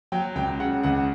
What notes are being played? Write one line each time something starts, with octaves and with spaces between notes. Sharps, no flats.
F#3 G5
C#2 G5
C#3 F#5
C#2 F#5